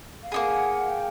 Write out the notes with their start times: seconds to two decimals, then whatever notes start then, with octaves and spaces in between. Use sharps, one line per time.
0.23 F5
0.31 A#3 D#4 G#4 F#5
0.90 G5